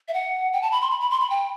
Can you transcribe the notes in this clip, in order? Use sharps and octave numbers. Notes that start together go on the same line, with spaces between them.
E5
F#5
G5
A5
B5
C6
B5
B5
C6
B5
G5